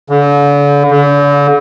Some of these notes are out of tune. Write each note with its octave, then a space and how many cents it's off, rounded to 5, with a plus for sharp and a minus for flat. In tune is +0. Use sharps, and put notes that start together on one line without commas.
D3 -40
D3 -40